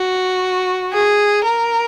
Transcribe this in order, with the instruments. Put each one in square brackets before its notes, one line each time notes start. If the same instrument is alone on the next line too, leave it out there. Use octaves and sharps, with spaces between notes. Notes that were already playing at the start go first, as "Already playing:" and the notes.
Already playing: [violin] F#4
G#4
A#4